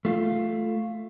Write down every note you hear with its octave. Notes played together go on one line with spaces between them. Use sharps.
A3 F4